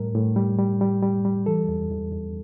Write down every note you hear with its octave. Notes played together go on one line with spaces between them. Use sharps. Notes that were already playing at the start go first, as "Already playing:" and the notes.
Already playing: A2 G3 A#4
A2
G3
G3
G3
G3
G3
E3 A4
E2
E2
E2